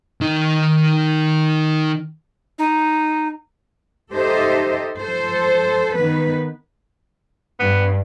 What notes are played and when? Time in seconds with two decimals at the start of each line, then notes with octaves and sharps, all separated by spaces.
0.21 D#3 D#4
2.58 D#4
4.12 D#4 G4 A4 C5 D#5 E5
4.98 F3 A4 C5
5.97 D#3 B3 B4
7.60 G2 B3